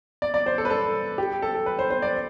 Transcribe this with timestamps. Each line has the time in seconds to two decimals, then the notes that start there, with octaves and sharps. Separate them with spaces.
0.22 D5
0.34 D5
0.46 C5
0.58 A4
0.65 B4
0.70 A4
1.18 G4
1.42 A4
1.66 B4
1.79 C5
1.90 C5
2.02 D5